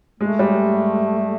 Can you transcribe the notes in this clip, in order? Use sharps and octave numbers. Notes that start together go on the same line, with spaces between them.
G#3 A3
G3